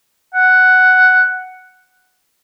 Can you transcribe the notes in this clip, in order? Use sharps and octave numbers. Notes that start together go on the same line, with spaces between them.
F#5